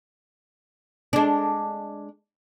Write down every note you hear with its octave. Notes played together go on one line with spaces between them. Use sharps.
G#3 D4